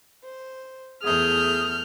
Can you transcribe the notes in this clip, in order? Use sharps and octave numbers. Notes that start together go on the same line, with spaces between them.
C5
E2 A3 G#4 D#6 F6 G6